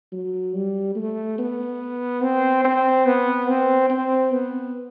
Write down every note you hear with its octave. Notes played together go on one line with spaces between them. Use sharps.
F#3
G3
A3
B3
C4
C4
B3
C4
C4
B3